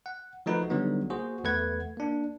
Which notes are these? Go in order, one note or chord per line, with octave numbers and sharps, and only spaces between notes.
F#5
F3 A3 D#4 F#4 A#4 B4
D3 F#3 G3 B3 D#4
A#3 F#4 G#4 C5
E2 A3 B4 F#5 G#6
A#3 D4